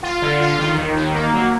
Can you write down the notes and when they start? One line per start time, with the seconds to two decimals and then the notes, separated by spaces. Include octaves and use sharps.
0.03 F4
0.22 D3
0.40 F4
0.59 D#3
0.77 D#2
0.96 D#3
1.14 A#3
1.33 F#3